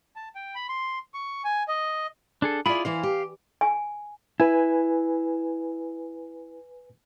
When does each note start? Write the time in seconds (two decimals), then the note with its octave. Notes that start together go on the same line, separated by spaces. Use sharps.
0.16 A5
0.35 G5
0.55 B5
0.69 C6
1.14 C#6
1.44 G#5
1.68 D#5
2.42 D4 G#4 A4
2.66 E4 F4 G#4 D5 B5
2.85 E3 E4 C5 F5
3.03 G4
3.61 G#5
4.40 E4 B4 G#5